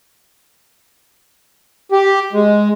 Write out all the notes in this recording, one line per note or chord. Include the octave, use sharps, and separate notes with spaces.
G4
G#3